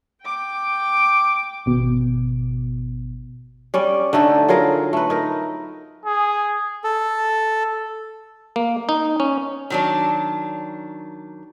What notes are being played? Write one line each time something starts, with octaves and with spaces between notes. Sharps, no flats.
G5 D6
G#1 B2
G3 C#4 D5
D3 A3 D#4 A4
F#3 F4 G#4 A#4
A3 B4
D#4 A#4
G#4
A4
A#3
D#4
C#4
D#3 F#3 D4